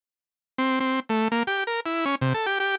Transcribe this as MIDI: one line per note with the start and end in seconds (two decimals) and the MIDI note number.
0.58 0.79 60
0.80 1.00 60
1.09 1.28 57
1.32 1.43 58
1.47 1.64 67
1.67 1.80 70
1.86 2.05 64
2.05 2.15 61
2.21 2.33 48
2.34 2.46 69
2.46 2.58 67
2.60 2.75 67